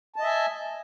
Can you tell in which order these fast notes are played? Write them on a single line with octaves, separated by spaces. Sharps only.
A5 D#5 E5 G#5